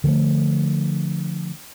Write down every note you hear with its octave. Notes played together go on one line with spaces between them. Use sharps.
D3 F3 G3 A3